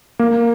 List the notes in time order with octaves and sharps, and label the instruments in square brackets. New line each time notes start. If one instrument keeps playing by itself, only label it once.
[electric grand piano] A#3